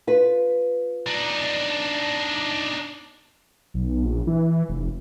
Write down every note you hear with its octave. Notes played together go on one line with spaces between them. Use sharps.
F4 B4
D4 D#4
B1
A#1
E3
F1